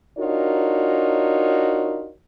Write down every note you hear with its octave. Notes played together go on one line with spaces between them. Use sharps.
D4 D#4 F4 F#4 A#4 C#5